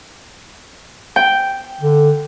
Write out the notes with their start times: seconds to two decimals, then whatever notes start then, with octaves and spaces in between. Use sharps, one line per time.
1.16 G5
1.81 D3